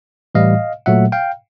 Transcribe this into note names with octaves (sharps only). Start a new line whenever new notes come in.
A2 E3 G3 D#5 F5
A#2 F#3 A3 E5 F#5
F5 G5